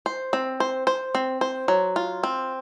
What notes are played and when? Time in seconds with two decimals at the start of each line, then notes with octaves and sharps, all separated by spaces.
0.06 C5
0.33 C4
0.60 C5
0.87 C5
1.15 C4
1.41 C5
1.68 F#3
1.96 F4
2.23 C4